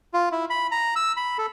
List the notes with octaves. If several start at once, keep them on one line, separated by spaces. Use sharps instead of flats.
F4
E4
B5
A#5
E6
B5
A4